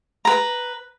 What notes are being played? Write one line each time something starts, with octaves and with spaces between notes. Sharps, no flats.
B4 A#5